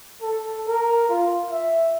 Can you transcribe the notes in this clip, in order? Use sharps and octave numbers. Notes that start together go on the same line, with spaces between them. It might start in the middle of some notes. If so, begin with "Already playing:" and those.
A4
A#4
F4
E5